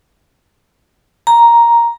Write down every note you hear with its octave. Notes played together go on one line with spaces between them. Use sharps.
A#5